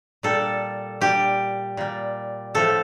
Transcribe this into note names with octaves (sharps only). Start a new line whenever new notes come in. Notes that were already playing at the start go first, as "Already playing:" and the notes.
A#2 G3 A4
A#2 G3 G4
A#2 G3
A2 F3 A3 A4